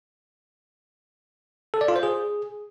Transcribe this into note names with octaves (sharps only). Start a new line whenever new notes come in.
A4
D5
F4
C5
G#4